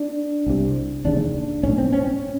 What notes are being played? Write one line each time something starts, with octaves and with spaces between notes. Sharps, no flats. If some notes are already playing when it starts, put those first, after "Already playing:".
Already playing: D4
C2 C3
E1 D#2 C#3 D4
B1 A2 C#4
C4
C#4
C#4